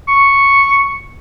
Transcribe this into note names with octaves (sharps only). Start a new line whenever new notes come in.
C#6